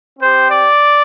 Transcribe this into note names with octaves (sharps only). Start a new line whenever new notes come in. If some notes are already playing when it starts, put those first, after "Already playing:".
C4 G4 C5
D5